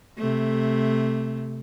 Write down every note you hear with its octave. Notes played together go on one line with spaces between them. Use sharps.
C3 A3